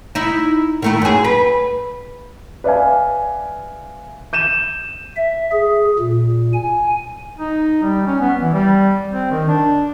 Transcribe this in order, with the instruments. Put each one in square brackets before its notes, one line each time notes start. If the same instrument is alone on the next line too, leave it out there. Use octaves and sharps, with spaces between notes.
[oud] D#4 E4
D#3 A3 E4
F#2 G#4
B4
[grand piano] B4 D5 E5 F5 G#5
G6 D#7 E7
[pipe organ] E5
G#4
A#2
G#5
[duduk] D#4
G3
C#4
B3
E3
G3
C4
D#3
D4